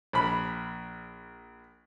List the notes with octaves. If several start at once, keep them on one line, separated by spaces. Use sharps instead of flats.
A#1 B5